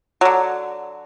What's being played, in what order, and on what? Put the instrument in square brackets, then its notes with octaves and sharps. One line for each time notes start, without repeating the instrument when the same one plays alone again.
[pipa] D3 F#3